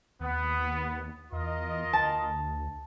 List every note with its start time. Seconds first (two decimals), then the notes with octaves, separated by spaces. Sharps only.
0.20 D#2 B3
1.32 E2 F4 A#4 D#5
1.93 D2 A5